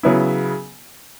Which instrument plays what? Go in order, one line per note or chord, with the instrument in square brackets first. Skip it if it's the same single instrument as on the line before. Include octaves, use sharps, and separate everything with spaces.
[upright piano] C#3 F#3 B3 E4